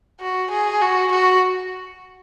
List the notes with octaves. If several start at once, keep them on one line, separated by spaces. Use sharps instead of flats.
F#4
G#4
F#4
F#4